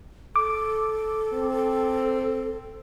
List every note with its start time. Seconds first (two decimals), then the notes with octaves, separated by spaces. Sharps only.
0.36 A4 D6
1.33 C4